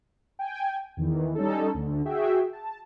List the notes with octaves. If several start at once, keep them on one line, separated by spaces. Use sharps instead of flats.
G5 G#5
E2 D#3 E3
G3 C#4 D#4 A4
D2 D3
F#4 G#4 E5 G5
A5